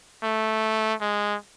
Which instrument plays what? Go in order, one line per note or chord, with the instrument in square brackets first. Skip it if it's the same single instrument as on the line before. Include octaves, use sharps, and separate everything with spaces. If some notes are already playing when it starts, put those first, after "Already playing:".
[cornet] A3
G#3